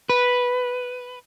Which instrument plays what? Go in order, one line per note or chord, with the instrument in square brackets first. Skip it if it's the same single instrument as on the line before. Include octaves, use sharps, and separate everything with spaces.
[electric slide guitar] B4